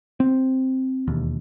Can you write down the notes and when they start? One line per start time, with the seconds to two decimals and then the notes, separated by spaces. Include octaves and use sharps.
0.20 C4
1.08 E1 D#2